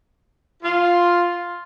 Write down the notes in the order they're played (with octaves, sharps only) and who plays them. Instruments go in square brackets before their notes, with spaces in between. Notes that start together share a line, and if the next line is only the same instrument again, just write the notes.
[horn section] F4